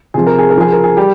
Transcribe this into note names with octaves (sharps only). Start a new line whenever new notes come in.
C3 F3 G#4
A#4
G#4
A#4
C#3 F3 G#4
A#4
G#4
G3 G4